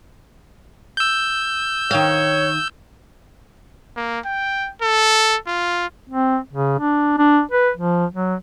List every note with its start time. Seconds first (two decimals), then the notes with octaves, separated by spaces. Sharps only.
0.97 E6 G6
1.91 D#3 C#5 F5
3.96 A#3
4.26 G5
4.82 A4
5.47 F4
6.09 C4
6.53 C#3
6.79 D4
7.18 D4
7.51 B4
7.77 F3
8.13 F#3